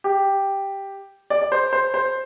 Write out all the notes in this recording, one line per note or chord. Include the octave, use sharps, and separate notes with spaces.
G4
D5
D5
C5
C5
C5